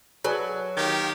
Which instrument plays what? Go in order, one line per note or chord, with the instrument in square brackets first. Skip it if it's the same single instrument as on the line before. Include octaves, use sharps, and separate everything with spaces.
[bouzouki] F#3 [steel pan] G#4 A4 B4
[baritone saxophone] D#3 [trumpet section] A#3 G4